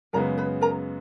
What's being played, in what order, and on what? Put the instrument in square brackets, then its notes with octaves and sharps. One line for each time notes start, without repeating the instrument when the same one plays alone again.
[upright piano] F#2 C#3 G#3 B3 [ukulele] A#4 A#5
[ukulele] B4 B5
A#4 A#5